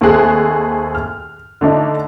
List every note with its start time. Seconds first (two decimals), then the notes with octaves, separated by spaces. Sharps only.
0.01 D#2 A3 C4 G#4 F#6
0.95 F6
1.61 D3 A3 D4 D#4